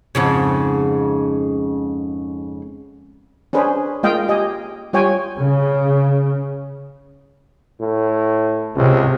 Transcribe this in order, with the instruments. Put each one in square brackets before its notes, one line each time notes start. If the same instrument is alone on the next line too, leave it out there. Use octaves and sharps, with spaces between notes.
[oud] F2 G#2 C#3
[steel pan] C#4 D4 G#4 B4 C5
G#3 A#3 F4 D#5 F5 G5
G4 D#5 G#5
G3 F4 C#5 G5 G#5
[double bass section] C#3
[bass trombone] A2
[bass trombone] C#2 [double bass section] C3